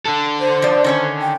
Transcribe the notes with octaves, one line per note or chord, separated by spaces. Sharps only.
D3 A4
C5
F3 D5
D#3 C#4 C#5
G5